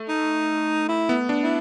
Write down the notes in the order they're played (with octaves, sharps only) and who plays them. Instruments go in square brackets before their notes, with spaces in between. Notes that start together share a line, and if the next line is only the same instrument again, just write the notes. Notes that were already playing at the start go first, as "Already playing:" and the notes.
Already playing: [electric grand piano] A3
[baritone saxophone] D#4
E4
[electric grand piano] B3
D4
[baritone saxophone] E4